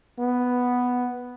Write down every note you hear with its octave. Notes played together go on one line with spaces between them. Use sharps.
B3